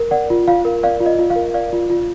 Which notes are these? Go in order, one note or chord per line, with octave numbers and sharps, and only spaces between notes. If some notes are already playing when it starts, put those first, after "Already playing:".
Already playing: A#4
D5 F#5
F4
F4 F5
A#4
D5 F5
F4
D#5
F4
F5
A#4
D5 F5
F4
F4